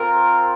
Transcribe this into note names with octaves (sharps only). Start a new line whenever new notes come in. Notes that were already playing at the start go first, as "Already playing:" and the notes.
Already playing: C4 F4 A#4